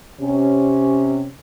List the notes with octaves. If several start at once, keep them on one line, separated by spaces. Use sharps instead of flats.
C3 C#4